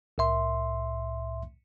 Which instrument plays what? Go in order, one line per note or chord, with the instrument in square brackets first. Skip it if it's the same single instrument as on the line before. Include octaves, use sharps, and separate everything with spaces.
[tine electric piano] C2 A2 E5 C6